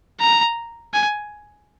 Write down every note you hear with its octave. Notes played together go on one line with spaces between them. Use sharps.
A#5
G#5